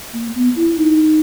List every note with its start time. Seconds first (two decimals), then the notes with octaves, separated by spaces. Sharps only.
0.13 A#3
0.35 B3
0.56 E4
0.77 D#4